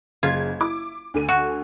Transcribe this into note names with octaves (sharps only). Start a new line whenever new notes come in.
F#1 C#3 F4 G#6
E4 D6
D2 D3 D#7
F#4